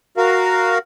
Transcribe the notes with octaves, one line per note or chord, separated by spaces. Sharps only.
F#4 A#4 F5